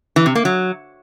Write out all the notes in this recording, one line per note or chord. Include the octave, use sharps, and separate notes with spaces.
E3
C3
A#3
F#3